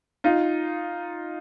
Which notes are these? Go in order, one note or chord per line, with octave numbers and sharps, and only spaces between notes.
D#4 F4